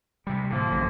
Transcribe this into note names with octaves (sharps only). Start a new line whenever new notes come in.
C3 G3
A2 D3 F3 A#3
A1 F#2 A2